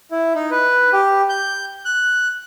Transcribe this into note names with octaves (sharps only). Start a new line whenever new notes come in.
E4
D#4
B4
G4
G6
F#6